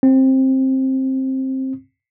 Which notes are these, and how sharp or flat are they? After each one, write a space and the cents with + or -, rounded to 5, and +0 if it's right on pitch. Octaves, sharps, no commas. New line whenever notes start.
C4 +15